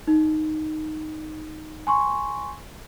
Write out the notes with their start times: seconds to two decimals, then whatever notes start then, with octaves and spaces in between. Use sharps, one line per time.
0.07 D#4
1.87 G#5 C6 C#6